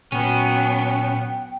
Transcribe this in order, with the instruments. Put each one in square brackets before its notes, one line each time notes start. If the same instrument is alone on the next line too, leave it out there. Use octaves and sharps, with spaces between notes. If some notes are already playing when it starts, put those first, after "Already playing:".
[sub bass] A#2 [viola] F#3 B3 [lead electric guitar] C#4 [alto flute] G5